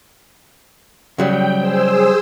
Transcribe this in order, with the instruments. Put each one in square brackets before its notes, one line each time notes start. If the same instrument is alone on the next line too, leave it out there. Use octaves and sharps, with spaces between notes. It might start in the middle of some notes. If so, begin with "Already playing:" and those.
[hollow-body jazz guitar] C#3 F#3 G3 [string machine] G5
[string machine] G#4 C5 E6